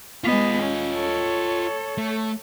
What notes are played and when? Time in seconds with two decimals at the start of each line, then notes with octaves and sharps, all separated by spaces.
0.24 G#3 B3 F4 D#5
0.62 C#4
0.94 A4 C#5
1.98 A3